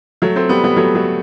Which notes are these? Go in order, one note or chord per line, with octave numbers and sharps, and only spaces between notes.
F#3 A3
A3 C4
G3 B3
G3 B3
F#3 A3
F#3 A3